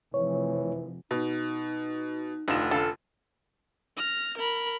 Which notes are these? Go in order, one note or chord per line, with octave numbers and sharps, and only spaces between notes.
F1 E3 C#5
B2 D#4
F1 D2 D#4 F4 E7
D3 A4 F5 A5
F6 A#6
A#4 B5